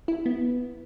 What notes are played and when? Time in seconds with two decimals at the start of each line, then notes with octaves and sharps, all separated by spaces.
0.08 E4
0.26 B3